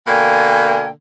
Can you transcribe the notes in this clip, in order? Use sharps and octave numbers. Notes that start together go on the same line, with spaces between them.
B2 D3 A#3 G5 G#5 G#6